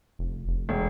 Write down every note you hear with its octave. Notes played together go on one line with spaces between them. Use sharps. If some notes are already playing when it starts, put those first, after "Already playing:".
F1
F1
E1